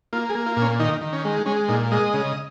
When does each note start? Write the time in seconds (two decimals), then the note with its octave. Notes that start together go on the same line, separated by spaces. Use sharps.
0.13 A#3 F4
0.29 G#4
0.35 A#3
0.46 F4
0.56 A#2
0.62 C#4
0.79 D#3 D#4
1.01 D#3
1.13 C#4
1.25 G#3
1.46 G#3 C#4
1.68 A#2 D#4
1.91 G#3 D#5
2.14 C#3